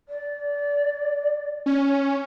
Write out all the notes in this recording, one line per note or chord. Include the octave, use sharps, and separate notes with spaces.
D5
C#4